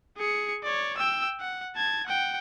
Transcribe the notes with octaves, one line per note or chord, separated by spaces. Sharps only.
G#4 C#7
C#5 D5
G5 E6
F#5
A5 G#6
F#5 G5